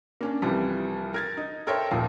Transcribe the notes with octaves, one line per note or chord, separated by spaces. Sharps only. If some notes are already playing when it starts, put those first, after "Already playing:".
A#3 C#4 D4
C2 E3 F3 G3
A#4 G#6 A6
D#4
A4 A#4 C5 C#5 E5 G5
D#1 D#2 A#2 F3 F5